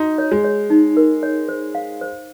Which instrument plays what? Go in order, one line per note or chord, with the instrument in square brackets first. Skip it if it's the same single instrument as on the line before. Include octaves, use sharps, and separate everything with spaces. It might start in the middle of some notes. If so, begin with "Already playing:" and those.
Already playing: [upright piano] D#4 [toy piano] F#4
[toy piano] C#5
[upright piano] G#3
[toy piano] C#5
D#4
A#4
C#5
C5
F5
C5